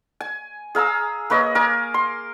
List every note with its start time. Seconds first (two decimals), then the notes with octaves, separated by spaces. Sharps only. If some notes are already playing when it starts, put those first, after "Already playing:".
0.20 G#5
0.75 G#4 F5 A#5 E6
1.30 A#3 B4 C#5 D#5
1.55 A#4 G#5 D6
1.94 C6